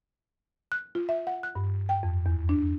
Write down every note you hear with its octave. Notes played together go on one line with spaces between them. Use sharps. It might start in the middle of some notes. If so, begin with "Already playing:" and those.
F#6
F4
E5
F#5
F#6
G2
G5
F2
E2
D4